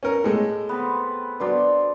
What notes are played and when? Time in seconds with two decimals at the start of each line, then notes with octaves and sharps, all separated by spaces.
0.03 C#4 A#4
0.24 A2 G#3 A4
0.69 B3 C4 B4
1.40 F#3 B3 D4 C5 D5